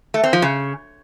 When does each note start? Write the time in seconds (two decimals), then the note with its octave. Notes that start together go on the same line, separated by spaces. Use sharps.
0.14 A3
0.24 C4
0.33 F3
0.42 C#3